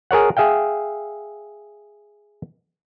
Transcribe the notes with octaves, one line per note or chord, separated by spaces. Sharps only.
G#4 A#4 C#5 F#5
G#4 E5 F5 G5